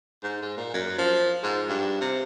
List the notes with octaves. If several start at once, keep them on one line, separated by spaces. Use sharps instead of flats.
G#2
G#2
A#2
F#2
F3
G#2
G2
C3